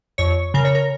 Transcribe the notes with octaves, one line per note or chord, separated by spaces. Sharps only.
F2 C#5
C#3 A#4
C#5
A#4